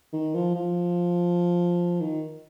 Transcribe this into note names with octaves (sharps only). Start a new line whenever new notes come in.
D#3
F3
F3
D#3